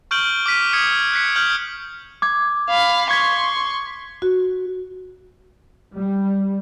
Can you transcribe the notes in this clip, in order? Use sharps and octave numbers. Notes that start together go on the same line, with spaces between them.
C#6 F6 G6 D7 F#7 G7
D6 F6 B6 D#7
D#6 G#6 C#7
F#6 G#6 B6 C#7
F6 G6 F#7 G7
D6 G#6
F5 B5
C6 C#6 G#6 B6
F#4
G3